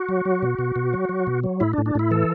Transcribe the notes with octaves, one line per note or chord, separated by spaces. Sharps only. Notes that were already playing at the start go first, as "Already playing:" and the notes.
Already playing: F#4
F#3
F#3
B2
B2
B2
F#3
F#3
B2
F#3
A2 E4
D4
A2
D4
A2 E4
E3 A4